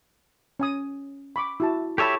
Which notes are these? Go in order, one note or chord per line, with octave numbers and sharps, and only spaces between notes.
C#4 G#5 D#6
B5 C#6 D6
E4 F#4 A5
G4 A4 C#5 E5 A5 B5